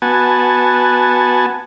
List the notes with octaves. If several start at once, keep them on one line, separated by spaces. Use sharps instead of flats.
B3 F#4 G#5 A5